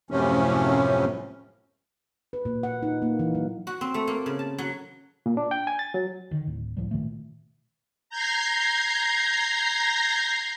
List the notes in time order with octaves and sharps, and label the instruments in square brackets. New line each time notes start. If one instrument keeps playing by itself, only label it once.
[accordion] F#2 A2 C3 F3 C#4
[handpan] B4
A#2
F#5
D#4
A#3
E3
F#3
[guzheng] F#4
C4
A3
A#3
C#3
A5
F#3
[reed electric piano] A#2
D4
G5
G#5
A6
F#3
[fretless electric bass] D3 D#3
D1 A2
C#2 A2 F3 G3
A#2 D#3 A3
[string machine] A#5 G6 G#6 A#6 C7